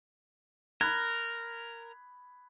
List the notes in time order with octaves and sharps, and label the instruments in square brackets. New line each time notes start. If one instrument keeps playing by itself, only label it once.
[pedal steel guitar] A#4 [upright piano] B5 F#6 G#6